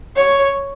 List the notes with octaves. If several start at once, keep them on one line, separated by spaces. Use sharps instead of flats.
C#5